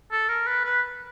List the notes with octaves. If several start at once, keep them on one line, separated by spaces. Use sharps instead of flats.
A4
A#4
B4
B4